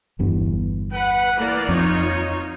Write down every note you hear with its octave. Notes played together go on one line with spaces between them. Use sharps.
G1 E2 G2
B4 F#5
E3 A#3 D5
F2 D#4 F4 C#5